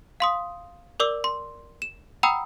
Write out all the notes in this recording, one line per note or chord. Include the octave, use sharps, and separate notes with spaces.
F5 C6 D#6
A#4 D5 D6 E6
C6
E7
F#5 G5 A#5 B5 D#6 E6